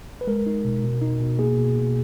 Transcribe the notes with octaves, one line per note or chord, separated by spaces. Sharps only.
B4
G#3 A#4
D#4
B2
B2
D#4
B2
A#3 G#4
B2
B2